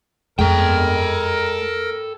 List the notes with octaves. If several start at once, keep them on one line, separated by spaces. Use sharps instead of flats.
F2 G#3 A4 A#4 G5